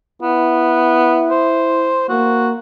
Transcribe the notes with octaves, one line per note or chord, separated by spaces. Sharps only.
B3 E4
C5
A#3 F#4